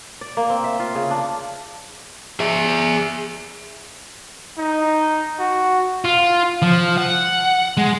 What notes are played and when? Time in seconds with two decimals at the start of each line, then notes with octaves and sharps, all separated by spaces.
0.21 D5
0.37 A#3
0.50 C4
0.64 E5
0.80 F4
0.95 C#3
1.11 D4
2.40 G#4 E5
4.58 D#4
5.39 F#4
6.04 F4
6.62 F3
6.97 F#5
7.77 G#3